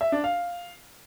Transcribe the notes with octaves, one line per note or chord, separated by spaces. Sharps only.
E5
D4
F5